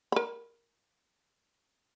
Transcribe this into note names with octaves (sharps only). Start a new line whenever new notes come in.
A#4 B5